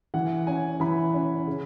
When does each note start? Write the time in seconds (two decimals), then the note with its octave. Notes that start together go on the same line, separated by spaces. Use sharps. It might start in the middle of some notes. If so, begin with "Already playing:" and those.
0.14 E3 F#5
0.47 C#4 G#5
0.80 E3 B5
1.14 C#4
1.47 C#3